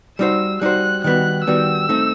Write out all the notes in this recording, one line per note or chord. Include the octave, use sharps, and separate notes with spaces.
G3 D#4 F#4 C5 E6
G3 D#4 F#4 C5 F#6
D#3 G3 B3 F#4 F#6
D#3 G3 B3 F#4 E6
A3 C4 D#4